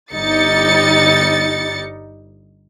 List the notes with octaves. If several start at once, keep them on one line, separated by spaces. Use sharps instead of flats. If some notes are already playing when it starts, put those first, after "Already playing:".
G1 G3 D#4 A6 C#7